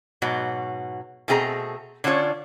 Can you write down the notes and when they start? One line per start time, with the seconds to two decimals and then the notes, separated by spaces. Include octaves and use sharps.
0.22 G#2 B2 F#3
1.28 B2 A3 C4 G#4 B4 A#5
2.04 D3 C#4 D4 F4 C#5